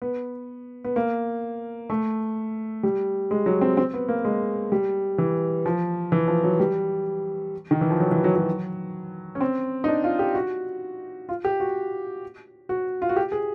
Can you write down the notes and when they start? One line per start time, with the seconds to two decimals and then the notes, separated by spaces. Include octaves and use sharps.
0.02 B3
0.84 B3
0.96 A#3
1.90 A3
2.83 G3
3.31 G#3
3.46 F#3
3.61 C4
3.77 C4
3.94 B3
4.09 A#3
4.25 G#3
4.72 G3
5.18 E3
5.66 F3
6.12 E3
6.28 F3
6.44 F#3
6.60 G3
7.71 D#3
7.81 E3
7.90 F3
8.00 F#3
8.11 E3
8.24 F#3
8.36 F#3
9.35 C#4
9.41 C4
9.84 D#4
9.88 D4
10.04 F4
10.19 G4
10.35 F#4
11.29 F4
11.44 G4
11.60 F#4
12.69 F#4
13.02 F4
13.09 F#4
13.16 G4
13.32 G#4